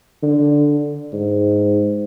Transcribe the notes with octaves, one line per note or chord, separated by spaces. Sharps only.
D3
G#2